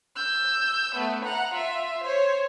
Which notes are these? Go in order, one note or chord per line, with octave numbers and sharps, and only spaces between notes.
E6 G6
A3 B3
F#5 A#5
F4 E5
C5 C#5